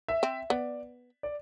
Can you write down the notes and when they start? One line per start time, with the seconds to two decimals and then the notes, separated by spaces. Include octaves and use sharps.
0.08 E5
0.23 C4
0.50 B3 D5
1.23 D5